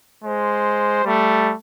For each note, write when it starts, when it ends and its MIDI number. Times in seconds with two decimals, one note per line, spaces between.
0.24 1.02 56
0.24 1.02 72
1.04 1.52 55
1.04 1.52 57